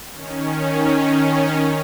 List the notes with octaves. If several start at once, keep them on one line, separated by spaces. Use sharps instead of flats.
D#3 C#4